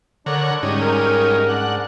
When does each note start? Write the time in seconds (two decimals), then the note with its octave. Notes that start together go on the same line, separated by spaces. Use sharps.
0.26 D3 D4 A#4 C#5 F#5
0.63 G#2 G3 C#4 D#4
0.81 A#4
1.49 D4 F#5